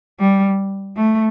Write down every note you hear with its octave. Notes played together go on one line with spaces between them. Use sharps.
G3
A3